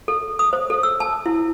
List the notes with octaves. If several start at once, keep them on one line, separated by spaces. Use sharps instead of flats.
A4
D#6
C5
A4
E6
A5
E4